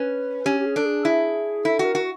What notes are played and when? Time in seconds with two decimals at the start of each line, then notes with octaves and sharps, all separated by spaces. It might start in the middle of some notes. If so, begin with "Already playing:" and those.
Already playing: C#4 B4
0.45 C#4 G4
0.60 G4
0.66 G#4
0.76 D4 A4
0.85 G#4
1.05 E4
1.65 E4 A4
1.79 F#4
1.85 A#4
1.95 F#4